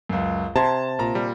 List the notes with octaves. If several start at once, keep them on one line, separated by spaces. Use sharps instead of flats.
C#2 F#2
C3 A5 A#5 C6 G#6
A#2 A#5
G3